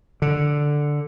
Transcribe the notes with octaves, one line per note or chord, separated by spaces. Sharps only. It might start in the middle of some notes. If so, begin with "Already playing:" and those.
D3